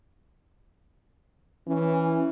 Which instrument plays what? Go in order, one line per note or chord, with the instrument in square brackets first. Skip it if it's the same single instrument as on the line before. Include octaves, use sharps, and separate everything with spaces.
[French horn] E3 [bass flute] C#4